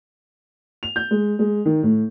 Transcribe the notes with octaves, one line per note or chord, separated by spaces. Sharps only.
F7
G6
G#3
G#3
D#3
A2